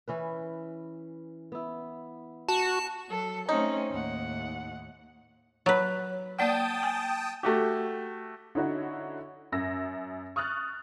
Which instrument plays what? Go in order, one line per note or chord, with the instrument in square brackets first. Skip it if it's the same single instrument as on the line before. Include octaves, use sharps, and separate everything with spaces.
[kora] E3 C#4 B4
B3 E4
[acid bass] F#4 [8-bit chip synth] A5
[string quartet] F#3 A4
[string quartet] A3 C4 C#4 [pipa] D#4
[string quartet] D#2 A2 F#5
[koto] F#3 B4 [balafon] C#5
[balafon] A#3 D5 F#5 [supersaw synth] G5 A5 D#6
[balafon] G#5
[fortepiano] A3 F#4 G4
[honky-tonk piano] D3 C#4 D#4 E4 F#4 C#5
F#2 E6 A#6
C#6 D#6 F6 F#6 A6